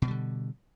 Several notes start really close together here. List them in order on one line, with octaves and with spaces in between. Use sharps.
B2 F#3 G3 D3